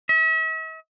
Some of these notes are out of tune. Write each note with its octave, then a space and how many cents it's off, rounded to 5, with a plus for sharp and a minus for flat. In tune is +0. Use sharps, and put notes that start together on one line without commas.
E5 -45